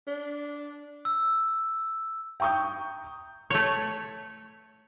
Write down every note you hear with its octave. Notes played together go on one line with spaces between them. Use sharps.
D4
E6
G5 A#5 C#6 D#6 G6
A3 C#5